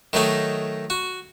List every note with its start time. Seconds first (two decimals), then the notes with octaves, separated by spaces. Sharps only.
0.13 D#3 F#3 A3 D#4
0.90 F#4